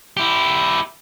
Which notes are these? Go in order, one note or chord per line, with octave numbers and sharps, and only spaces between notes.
E4 G4